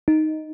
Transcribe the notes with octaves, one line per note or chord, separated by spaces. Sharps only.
D#4